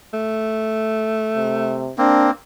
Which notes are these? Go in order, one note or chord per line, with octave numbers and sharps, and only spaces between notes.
A3
C3
A#3 C4 D4